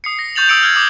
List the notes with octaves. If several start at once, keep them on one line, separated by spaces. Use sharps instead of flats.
D#6 C7 C#7
A#6
C#6 G6 A6 F7 F#7
D#6 E6 G6 C#7 D7 F#7
E6 F6 G#6
D6 D#6 F#7